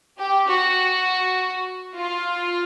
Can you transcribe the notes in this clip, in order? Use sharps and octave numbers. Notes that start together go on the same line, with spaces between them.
G4
F#4
F4